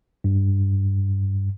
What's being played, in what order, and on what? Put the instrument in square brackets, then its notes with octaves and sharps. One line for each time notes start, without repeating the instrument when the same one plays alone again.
[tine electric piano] G2